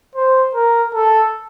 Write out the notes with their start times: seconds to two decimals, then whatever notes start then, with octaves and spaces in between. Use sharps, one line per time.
0.15 C5
0.55 A#4
0.94 A4